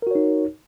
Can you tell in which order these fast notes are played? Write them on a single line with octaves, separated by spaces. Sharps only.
A#4 F#4 C#5 D#4